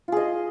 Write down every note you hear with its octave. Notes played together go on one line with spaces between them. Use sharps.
F4 G#4 D#5